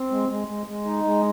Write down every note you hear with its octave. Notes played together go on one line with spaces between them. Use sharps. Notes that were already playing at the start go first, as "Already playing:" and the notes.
Already playing: C4
G#3
G#3
G#3
G#3
D#4
G#3